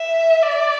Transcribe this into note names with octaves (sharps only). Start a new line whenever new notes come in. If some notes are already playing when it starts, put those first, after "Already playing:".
Already playing: E5
D5